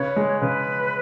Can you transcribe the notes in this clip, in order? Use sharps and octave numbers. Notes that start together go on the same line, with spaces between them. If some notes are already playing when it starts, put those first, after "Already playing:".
Already playing: C#3 B4 C#5
G#3
C#3 B4